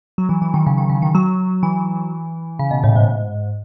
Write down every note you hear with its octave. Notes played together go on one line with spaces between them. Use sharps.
F#3
E3
E3
D#3
C#3
D#3
C#3
D#3
F#3
E3
C#3
B2
A2
G#2